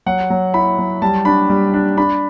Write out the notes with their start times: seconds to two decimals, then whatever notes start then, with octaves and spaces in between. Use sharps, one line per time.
0.06 F#3 F#5
0.30 F#3
0.54 E4 B5
0.78 F#3
1.02 G3 A5
1.25 D4 B5
1.50 G3
1.74 D4
1.97 D4 B5